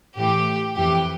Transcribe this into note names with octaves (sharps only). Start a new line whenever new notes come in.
A2 E3 G4
F2 E3 G4